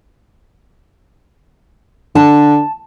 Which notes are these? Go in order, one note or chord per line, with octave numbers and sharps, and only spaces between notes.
D3 A5